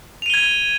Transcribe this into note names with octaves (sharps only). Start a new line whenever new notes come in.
G#6 D#7 F7 G7